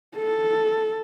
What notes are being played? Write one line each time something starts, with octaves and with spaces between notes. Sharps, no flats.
A4